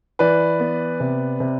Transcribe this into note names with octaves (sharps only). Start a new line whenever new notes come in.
E3 B4 D5
B3
C3
C3